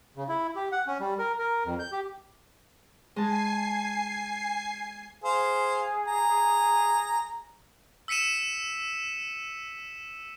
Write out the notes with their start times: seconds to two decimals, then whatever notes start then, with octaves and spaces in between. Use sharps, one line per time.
0.16 C#3
0.29 E4
0.56 G4
0.72 F#5
0.87 C#4
1.00 G3
1.19 A#4
1.39 A#4
1.65 F2
1.79 G6
1.92 G4
3.16 G#3 G#5 A5 C7
5.24 G#4 C5 F5
6.08 A#5
8.08 E6 B6 C#7 D#7 E7